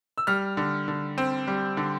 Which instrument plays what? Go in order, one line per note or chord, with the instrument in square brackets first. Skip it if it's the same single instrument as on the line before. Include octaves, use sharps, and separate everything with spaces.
[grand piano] E6
G3 F6
D3
D3
C4
G3
D3